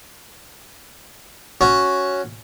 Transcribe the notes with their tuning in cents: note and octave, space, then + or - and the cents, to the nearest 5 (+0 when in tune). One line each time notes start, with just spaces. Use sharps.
C#4 +0 F#4 +0